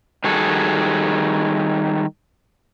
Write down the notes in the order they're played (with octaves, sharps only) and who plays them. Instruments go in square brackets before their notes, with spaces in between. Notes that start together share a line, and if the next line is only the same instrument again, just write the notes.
[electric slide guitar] D#3 G3 F#4 G#4 A4